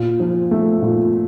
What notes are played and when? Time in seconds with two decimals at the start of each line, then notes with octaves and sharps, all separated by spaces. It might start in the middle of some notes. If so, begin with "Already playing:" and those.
Already playing: A#2
0.20 F3
0.51 A3
0.82 A#2